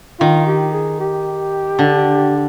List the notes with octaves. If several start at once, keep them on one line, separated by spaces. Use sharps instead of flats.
D#3 F4
G4
G#4
G4
D3